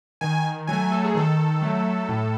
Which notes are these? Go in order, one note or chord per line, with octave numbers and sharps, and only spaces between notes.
D#3 G#5
F#3 A3 G#5
A4
G#4
D#3 A4
F#3 A3
A2